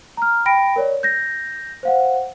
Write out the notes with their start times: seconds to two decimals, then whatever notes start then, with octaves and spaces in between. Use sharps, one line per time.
0.17 A#5 F6
0.46 G5 B5 A#6 D7
0.76 A#4 C#5 D5
1.03 G6 A#6
1.83 C5 F5 F#5